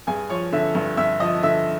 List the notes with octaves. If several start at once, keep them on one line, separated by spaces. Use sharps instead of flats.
G2 G#4 G#5
F3 C#5 C#6
D3 E5 E6
G2
G2 E5 E6
F3 D#5 D#6
D3 E5 E6